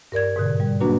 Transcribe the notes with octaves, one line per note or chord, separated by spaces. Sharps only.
G2 A#4 D5 G#6
G#2 B2 D3
G3
F#3 A#3 D4 F#4 B4